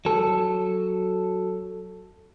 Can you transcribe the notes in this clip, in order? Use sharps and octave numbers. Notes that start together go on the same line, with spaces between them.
F#3 A4